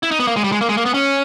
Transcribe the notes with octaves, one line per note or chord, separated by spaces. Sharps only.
E4
D#4
B3
A#3
G#3
G3
G#3
A#3
G#3
A#3
B3
C#4